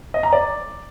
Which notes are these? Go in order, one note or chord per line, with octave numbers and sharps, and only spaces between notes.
D#5
A#5
D5